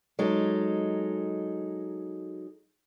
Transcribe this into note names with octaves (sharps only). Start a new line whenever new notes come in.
F#3 G#3 D#4 A4